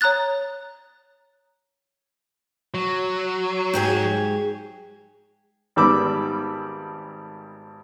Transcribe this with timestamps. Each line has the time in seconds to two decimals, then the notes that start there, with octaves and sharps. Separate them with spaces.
0.01 C#5 A#5 D#6 F#6 A6
2.74 F#3
3.74 G#2 G4 G#4
5.76 G#1 G3 B3 B5 D6 E6